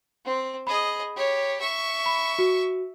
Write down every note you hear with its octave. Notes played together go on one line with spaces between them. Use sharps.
C4
G#4 D#5 B5
G4 C#5
E5 C#6
B5
F#4